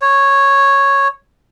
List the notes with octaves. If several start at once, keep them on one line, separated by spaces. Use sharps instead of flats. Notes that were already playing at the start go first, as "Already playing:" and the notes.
C#5